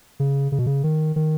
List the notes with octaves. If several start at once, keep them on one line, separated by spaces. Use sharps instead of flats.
C#3
C#3
B2
C#3
D#3
D#3